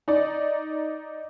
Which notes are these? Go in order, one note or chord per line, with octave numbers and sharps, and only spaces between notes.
D#4 D5